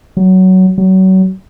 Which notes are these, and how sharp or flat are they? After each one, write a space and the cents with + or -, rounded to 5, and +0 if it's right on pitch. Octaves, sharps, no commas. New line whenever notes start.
F#3 +15
F#3 +30